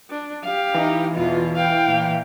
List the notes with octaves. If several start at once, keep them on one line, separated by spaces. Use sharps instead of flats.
D4
G4 F5
E3 D#4
E2 B2 F4
F5 G5
A#2